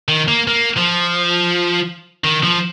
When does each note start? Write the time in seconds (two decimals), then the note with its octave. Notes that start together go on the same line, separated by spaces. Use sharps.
0.08 D#3
0.28 A#3
0.48 A#3
0.77 F3
2.24 D#3
2.44 F3